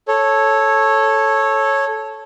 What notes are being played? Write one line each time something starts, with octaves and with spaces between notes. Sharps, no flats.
A4 C#5